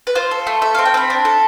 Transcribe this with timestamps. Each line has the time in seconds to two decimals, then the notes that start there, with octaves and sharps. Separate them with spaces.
0.07 B4
0.15 F4 C5
0.31 A4
0.47 A3
0.62 A4 E5
0.75 C4 F5
0.85 G5
0.94 C4 B5
1.10 D4
1.25 A4